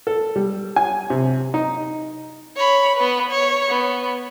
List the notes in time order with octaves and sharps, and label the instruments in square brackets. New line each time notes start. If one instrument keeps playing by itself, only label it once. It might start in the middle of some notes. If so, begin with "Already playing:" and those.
[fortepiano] A4
G3
G#5
C3
D#4
[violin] C#5 B5
B3 B4
C#5
B3